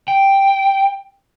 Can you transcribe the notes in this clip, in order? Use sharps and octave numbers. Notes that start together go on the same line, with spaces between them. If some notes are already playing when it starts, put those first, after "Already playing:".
G5